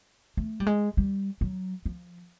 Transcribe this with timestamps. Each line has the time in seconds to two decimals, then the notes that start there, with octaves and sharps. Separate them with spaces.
0.37 A3
0.60 G3
0.67 G#3
0.97 G3
1.41 F#3
1.86 F3